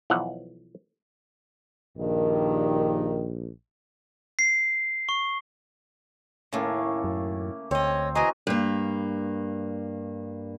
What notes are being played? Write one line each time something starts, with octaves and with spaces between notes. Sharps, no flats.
B1 E3 F3 F#5
A#1 G2 D#3
C7
C#6
D#2 A2 C#3 A3 A#3
F#2
D2 C4 C#5 D#5
E3 F#4 G#4 D#5 G#5 A#5
G2 A#3